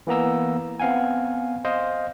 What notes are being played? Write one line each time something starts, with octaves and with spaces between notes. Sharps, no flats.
E3 A#3 B3 A#5 E6
B3 C4 F5 F#5 G#5
C5 D#5 F5